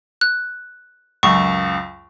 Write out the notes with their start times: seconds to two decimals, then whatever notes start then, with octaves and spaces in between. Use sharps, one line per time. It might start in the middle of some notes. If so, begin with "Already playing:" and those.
0.21 F#6
1.23 C#2 F#2 C#6